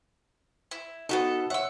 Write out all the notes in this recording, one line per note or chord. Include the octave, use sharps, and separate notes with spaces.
E4
B3 C#4 D#4 F#4 A4
C#5 E5 F#5 E6